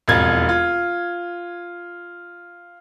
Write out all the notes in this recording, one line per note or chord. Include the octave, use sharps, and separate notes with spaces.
E1 F2 F4 G#6
F4